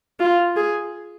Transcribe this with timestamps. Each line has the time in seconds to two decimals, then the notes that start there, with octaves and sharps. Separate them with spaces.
0.20 F4
0.56 G#4